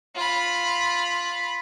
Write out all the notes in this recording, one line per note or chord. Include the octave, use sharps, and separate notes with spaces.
F4 B5